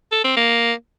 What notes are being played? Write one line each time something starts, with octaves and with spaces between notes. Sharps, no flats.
A4
C4
A#3